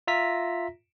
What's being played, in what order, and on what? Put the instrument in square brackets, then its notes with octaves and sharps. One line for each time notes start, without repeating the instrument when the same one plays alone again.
[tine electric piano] F4 E5 A#5 A#6 B6